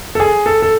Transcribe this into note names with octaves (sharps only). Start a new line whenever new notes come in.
A4
G#4
A4
A4